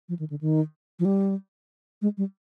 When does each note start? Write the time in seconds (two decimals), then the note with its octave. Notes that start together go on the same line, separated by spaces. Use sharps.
0.09 F3
0.19 D#3
0.30 D3
0.41 D#3
0.99 F3
1.05 G3
2.02 G#3
2.18 G3